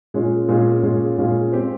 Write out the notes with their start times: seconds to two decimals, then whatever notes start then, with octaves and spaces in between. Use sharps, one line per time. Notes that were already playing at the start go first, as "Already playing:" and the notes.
0.14 A#2 G#3 C#4 F4 G#4
0.48 A#2 G#3 C#4 F4 G#4
0.83 A#2 G#3 C#4 F4 G#4
1.18 A#2 G#3 C#4 F4 G#4
1.52 G#3 C4 G4 C5